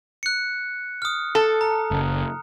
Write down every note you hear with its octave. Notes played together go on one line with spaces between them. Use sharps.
F#6 C#7
D#6 F6
A4
A#5
F#1